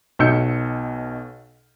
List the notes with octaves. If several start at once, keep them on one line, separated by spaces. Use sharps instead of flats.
B1 B2 E6 G6 C#7